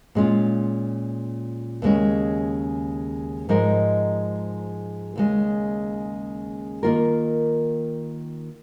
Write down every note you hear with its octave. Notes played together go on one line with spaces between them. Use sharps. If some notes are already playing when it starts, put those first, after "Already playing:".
A#2 G#3 C#4 F4
D#2 C#3 G#3 C#4
G#2 F3 G#3 D#4 A#4
D#2 C#3 G#3
D#3 A#3 F4 A#4